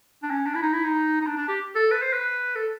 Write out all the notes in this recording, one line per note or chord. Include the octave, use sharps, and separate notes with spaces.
D4
C#4
D4
E4
D#4
E4
D#4
D#4
D4
D4
G4
A4
B4
C5
B4
A4